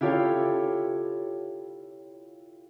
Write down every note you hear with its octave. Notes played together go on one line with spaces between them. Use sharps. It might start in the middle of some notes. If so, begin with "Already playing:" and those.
E4 F4 G4 A4 C#5